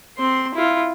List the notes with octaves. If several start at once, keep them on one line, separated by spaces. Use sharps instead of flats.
C4 C6
E4 F4